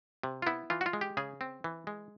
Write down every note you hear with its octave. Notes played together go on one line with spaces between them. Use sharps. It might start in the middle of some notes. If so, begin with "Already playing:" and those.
C3
F4
B3 E4
E3 F4
F#4
F4
G#3
G4
C#3 G#4
C4
E3
G#3